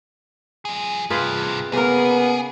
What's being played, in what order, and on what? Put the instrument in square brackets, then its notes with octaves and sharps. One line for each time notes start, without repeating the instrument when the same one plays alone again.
[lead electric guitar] F3 G#4
[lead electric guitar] G2 C3 [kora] F4 G#4 B4
[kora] C#3 A#3 A#4 [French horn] B3 [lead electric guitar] G#4